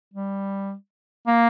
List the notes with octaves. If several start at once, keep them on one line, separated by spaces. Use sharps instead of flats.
G3
A#3